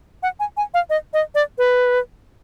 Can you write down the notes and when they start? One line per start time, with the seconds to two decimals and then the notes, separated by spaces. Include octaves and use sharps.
0.23 F#5
0.40 G#5
0.57 G#5
0.74 F5
0.90 D#5
1.14 D#5
1.35 D5
1.58 B4